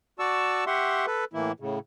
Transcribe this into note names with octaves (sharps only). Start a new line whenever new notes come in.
F#4 D5 A5 C#6 E6
G4 E5 F#5 C6 C#6
A4 B4
A2 E3 A#3 E4
A2 C#3